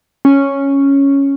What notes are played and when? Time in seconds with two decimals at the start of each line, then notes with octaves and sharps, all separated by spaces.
0.25 C#4